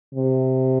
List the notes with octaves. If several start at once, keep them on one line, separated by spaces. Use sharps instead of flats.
C3